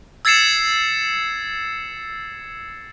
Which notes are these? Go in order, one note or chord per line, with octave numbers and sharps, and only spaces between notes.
E6 G#6 A6 C7 C#7 E7